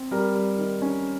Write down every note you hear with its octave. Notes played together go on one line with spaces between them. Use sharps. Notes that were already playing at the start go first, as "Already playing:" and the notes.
Already playing: C4
G3 A#4
G3
D#3
C#4